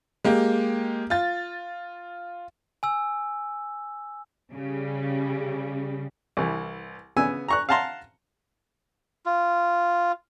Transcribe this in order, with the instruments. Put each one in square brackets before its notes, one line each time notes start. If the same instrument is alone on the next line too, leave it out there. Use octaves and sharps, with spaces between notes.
[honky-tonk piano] G#3 A#3 G4
F4 A6
[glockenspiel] G#5 E6
[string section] C#3 G3
[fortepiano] C2 E3
C#3 B3 G#5 E6
A#5 C#6 F#6
F5 F#5 A5 A#5 C6
[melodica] F4